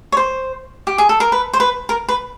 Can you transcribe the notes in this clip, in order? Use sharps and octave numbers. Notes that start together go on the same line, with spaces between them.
C#5
C5
G4
G#4
A4
A#4
B4
C5
B4
A#4
B4